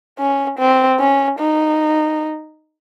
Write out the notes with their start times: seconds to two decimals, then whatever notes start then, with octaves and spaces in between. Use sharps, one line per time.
0.19 C#4
0.59 C4
1.00 C#4
1.39 D#4